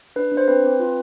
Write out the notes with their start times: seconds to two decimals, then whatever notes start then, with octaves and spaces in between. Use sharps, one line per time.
0.16 D4 B4
0.32 D4
0.37 C5
0.48 C4 B4
0.64 C4
0.80 F4